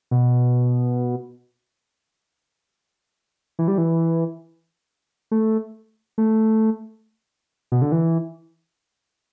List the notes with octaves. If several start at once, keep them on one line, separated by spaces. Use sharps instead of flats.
B2
E3
G3
E3
A3
A3
B2
D3
E3